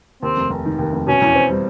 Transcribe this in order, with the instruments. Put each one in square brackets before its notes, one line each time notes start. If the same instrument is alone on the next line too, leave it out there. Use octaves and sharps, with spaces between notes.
[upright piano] D#2 [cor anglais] C4
[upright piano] F1
F1
D#3
D#2
F1
[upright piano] B2 [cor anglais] C#4
[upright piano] E2
C4
G3